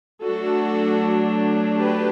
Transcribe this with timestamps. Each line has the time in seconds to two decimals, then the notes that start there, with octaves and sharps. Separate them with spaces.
0.24 F#3 A3 D4 F#4 A4
1.78 G4 B4